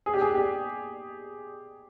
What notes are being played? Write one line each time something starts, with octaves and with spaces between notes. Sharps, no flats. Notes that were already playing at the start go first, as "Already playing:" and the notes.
G#4
G4
G#4
G4